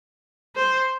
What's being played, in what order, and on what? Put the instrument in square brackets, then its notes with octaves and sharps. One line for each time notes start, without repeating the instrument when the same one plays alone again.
[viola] C5